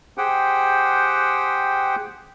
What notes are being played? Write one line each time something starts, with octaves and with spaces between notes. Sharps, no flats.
G4 G#4 C5 F#5 G5